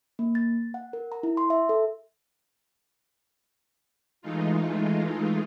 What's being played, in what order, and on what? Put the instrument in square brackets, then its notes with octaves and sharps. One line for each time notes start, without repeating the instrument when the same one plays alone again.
[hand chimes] A#3
A6
F#5
A#4
A#5
E4
C6
E5
A4
[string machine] E3 G#3 A3 D#4 F4